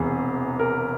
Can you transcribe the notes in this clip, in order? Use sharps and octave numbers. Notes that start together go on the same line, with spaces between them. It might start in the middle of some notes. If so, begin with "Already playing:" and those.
Already playing: E1 E2 C3 E3 G#4
A#4